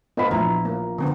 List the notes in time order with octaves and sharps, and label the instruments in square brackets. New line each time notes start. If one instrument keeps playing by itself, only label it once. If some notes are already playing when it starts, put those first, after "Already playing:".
[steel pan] B3 F4 [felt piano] C5 D#5 B5
[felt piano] A#1 A#5 [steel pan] E3 E4
[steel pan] A#3
D3 B3 C4